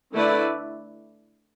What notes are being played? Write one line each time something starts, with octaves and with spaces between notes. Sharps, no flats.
D3 A3 E4 B4 D5